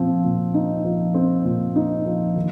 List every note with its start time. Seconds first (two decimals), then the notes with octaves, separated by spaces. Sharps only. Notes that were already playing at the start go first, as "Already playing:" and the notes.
Already playing: A#2 F3 C4
0.24 A#2
0.54 D#4
0.85 F3
1.14 C4
1.45 A#2
1.76 D#4
2.06 F3
2.36 D#3